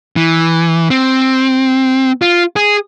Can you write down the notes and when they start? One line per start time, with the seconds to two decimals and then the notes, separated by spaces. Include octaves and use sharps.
0.16 E3
0.90 C4
2.22 F4
2.56 G#4